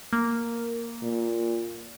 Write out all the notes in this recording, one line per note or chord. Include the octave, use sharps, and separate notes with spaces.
A#3
A#2